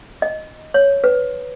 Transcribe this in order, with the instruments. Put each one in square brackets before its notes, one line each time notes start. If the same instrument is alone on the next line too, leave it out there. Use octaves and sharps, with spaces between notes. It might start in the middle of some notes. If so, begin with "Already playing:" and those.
[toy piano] D#5
C#5
B4